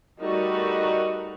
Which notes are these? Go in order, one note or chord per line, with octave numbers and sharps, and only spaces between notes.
G3 A3 D#4 F#4 A#4